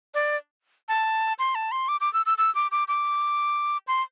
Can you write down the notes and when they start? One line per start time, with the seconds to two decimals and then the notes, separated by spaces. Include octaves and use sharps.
0.14 D5
0.89 A5
1.39 C6
1.55 A5
1.72 C6
1.88 D6
2.01 D6
2.14 E6
2.26 E6
2.38 E6
2.55 D6
2.71 D6
2.88 D6
3.88 C6